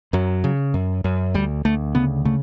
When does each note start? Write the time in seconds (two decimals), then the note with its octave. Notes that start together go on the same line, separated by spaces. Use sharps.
0.13 F#2 F#3
0.44 C#3
0.74 F#2
1.04 F#2
1.34 D2 G3
1.65 D2 A3
1.95 C#3 B3
2.25 C#3 A3